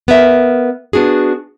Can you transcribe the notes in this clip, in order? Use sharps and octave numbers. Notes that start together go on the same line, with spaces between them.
B3 A#4 E5
B3 D4 F#4 G#4